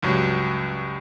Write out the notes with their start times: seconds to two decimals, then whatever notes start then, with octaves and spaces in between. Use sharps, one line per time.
0.02 C#2 G2 F#3